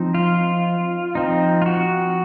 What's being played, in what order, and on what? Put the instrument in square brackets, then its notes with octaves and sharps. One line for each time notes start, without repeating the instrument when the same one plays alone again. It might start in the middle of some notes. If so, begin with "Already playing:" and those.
Already playing: [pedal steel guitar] F3 C4 D#4
F4
F3 C4 D#4
F4
F#4